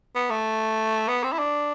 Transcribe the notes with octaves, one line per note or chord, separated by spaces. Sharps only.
B3
A3
B3
C4
E4
D4